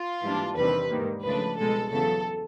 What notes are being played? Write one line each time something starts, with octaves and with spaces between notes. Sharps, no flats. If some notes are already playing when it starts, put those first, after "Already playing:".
Already playing: F4
G#2 E3 G3 A#3 D4
E2 C3 D#3 G3 C4 B4
G#2 D#3 G3 A#3
C#2 C#3 F3 A3 D4 B4
C2 B2 G#3 A4
E2 C#3 F#3 A4